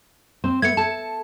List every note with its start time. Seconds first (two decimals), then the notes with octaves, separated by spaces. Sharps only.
0.44 C4 C5
0.62 A3 B3 G#6 C#7
0.77 A4 A5